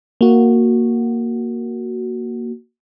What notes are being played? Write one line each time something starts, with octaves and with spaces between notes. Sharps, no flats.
A#3 F#4